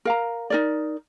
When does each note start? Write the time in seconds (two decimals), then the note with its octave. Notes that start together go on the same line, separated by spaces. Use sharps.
0.05 A#4 F5 A#5
0.50 D#4 A#4 D5